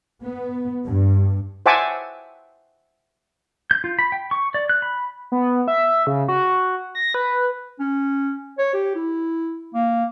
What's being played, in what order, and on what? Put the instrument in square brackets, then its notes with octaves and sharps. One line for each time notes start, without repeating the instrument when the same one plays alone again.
[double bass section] B3
G2
[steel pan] C5 E5 F#5 G#5 A5 D6
[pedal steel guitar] G6
F4
B5
G5
C#6
D5
F#6
B5
[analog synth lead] B3
E5
C#3
F#4
A#6
B4
[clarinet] C#4
C#5
G4
E4
A#3